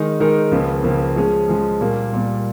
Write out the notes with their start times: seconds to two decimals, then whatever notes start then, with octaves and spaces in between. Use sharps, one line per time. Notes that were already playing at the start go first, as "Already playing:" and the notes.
Already playing: D#3 G#3 D#4 A#4
0.20 D#3 G#3 D#4 A#4
0.52 C#2 C#3 F3 A#3
0.84 C#2 C#3 F3 A#3
1.16 F3 G#3 C#4 G#4
1.48 F3 G#3 C#4 G#4
1.81 A#2 G3 A#3
2.13 A#2 G3 A#3